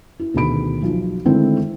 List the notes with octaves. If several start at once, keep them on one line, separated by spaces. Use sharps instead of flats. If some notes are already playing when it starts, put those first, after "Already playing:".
E4
D2 B2 D#3 G#4 B5 D7
B1 F3
D3 D#3 G#3 A3 C4 E4